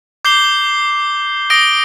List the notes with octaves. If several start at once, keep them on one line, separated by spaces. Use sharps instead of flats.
D6 G6 C7 G7
D#6 A#6 D7 G7